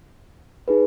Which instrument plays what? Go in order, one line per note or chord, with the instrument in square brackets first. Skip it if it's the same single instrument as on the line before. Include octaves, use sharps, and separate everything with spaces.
[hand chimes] D#4 G#4 B4